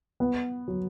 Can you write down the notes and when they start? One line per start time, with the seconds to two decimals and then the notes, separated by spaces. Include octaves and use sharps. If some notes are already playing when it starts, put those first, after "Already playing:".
0.20 B3
0.68 F#3